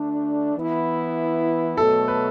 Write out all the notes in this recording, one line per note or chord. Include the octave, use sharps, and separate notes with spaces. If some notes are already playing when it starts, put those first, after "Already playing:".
Already playing: D2 D3 A3 D4
E3 B3 E4
B2 F#3 A3 A4
B4